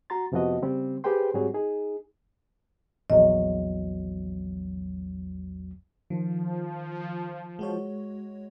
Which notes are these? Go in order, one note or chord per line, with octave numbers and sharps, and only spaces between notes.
F#4 A#5 C6 A6
F2 C3 F3 B3 F#4 D#5
C#3 G3 C4
G4 G#4 B4 C5 G5 C6
G#2 G3 C4 F#4 G#4 C#5
D#4 G#4
A#1 E2 F#3 D#5
D#3 F3
G#3 F#4 C#5